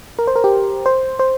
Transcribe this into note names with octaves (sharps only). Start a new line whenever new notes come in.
A#4
C5
A#4
G4
C5
C5